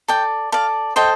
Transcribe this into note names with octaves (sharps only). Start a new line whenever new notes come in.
A4 D5 G5
A4 D5 F5
A4 C5 D#5 G5